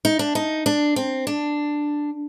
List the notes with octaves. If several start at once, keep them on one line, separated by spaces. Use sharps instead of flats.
D#4
D4
D#4
D4
C4
D4